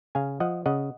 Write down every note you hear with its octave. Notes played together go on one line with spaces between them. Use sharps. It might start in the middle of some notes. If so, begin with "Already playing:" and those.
C#3 F5 G#5
F3 D#5 F#5
C#3 D#5 F#5